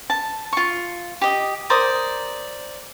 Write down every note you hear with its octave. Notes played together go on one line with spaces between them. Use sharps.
A5
F4 C#6
G4 D#5
A#4 C5 D5 D#6